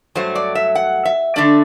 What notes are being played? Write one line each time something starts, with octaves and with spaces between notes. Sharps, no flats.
G2 F#3 A3 C5
D5
E5
F#5
E5
D3 A3 D4 D5